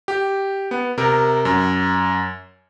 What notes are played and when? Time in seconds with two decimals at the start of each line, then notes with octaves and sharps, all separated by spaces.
0.08 G4
0.71 B3
0.98 C3 A#4
1.45 F#2